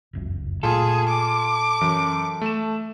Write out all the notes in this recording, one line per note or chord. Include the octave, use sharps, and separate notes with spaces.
F1 C#2 F#2
A#2 A3 F4 G#4 A4
D6
F#2 E3
A3 E7